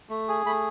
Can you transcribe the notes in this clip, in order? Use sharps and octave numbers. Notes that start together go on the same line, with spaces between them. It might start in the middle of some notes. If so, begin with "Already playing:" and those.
A3
G#4
A3 B5